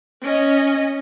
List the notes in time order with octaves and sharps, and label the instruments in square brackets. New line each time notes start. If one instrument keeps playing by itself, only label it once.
[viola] C#4 D#5